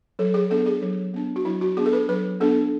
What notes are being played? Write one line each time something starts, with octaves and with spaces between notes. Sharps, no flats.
F#3 A4
G#4
B3 D4 A4
G#4
F#3
B3 D4
F#4
F#3 E4
F#4
B3 D4 G#4
A4
B4
F#3 B4
B3 D4 A4